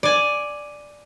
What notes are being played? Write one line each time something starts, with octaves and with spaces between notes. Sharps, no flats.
D5 G#5